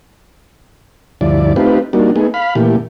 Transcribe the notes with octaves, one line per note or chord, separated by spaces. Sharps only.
D2 G2 F3 E4 D5
A3 C4 D#4 F4 G4 B4
G3 A#3 D4 D#4 F#4
A3 B3 D#4 G#4
F5 B5
A#2 E3 A3 G4